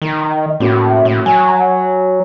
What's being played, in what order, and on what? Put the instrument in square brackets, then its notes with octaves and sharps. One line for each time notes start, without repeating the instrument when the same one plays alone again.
[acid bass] D#3
[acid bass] A2 [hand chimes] A#3 C#4 F#4
[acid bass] A2
[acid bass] F#3 [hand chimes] G#5